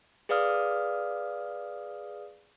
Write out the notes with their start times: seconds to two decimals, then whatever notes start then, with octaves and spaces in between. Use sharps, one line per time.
0.29 G#4 B4 D5 F5 D#6 F6